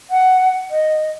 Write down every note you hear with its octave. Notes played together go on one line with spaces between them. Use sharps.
F#5
D#5